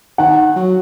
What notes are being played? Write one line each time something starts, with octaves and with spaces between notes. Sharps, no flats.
D#3 F#5
F#3